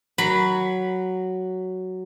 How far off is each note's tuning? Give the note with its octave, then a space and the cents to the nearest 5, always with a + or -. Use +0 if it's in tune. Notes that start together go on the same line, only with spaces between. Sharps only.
F#3 +5 B5 +0